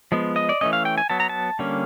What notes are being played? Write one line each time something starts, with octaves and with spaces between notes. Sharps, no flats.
F3 G#3 B3
D#5
D5
E3 A3 C#4 D#5
F5
G5
G#5
F#3 B3 A5
A#5
A5
D3 G3 A#3 C#4